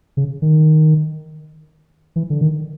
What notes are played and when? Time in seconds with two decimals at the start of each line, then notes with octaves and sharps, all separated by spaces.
0.17 C#3
0.42 D#3
2.16 E3
2.30 D3
2.41 D#3